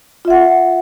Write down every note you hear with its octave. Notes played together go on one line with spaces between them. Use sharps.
F4 E5 F#5